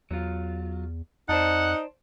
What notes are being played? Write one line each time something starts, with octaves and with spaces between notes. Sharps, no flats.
E2 F#3 F4
F2 D#4 C5 D5 F#5 A5